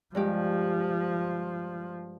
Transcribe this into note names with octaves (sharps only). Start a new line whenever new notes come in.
G2 F3 G#3 G4